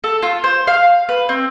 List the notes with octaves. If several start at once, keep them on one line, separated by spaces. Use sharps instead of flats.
A4
F4
C5
F5
B4
C4